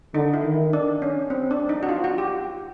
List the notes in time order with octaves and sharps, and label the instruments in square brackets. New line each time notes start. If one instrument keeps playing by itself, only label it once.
[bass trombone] D3 [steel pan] D#4
[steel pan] E4
[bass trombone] D#3
[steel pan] D4
C#4
C4
D4
D#4
F#4
F4
F#4
G4